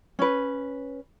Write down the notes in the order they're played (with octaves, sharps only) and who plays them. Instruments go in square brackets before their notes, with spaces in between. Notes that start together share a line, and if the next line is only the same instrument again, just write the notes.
[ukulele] C#4 B4